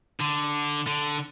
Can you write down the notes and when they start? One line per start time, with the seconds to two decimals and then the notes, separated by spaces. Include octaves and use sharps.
0.20 D3
0.87 D3